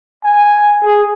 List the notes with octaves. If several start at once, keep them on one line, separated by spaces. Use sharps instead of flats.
G#5
G#4